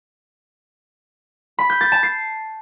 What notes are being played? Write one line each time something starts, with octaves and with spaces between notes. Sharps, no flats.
B5
G6
A6
A5
C7